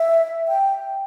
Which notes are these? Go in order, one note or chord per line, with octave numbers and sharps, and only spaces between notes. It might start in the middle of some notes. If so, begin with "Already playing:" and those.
Already playing: E5
G5